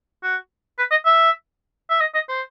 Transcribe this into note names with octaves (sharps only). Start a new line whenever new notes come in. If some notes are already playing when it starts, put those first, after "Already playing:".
F#4
B4
D#5
E5
E5
D#5
D#5
C5